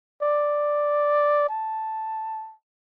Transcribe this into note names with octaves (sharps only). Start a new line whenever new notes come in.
D5
A5